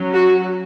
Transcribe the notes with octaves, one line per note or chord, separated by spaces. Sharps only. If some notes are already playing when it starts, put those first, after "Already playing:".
Already playing: F#3 C#4
F#4